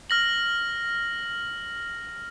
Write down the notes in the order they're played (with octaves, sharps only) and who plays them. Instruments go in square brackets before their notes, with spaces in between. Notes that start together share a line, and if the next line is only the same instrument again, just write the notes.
[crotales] F6 A#6 F#7